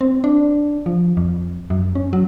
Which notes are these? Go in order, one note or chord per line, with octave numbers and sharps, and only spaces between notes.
C4
D4
F3
F2
F#2
C#4
F#3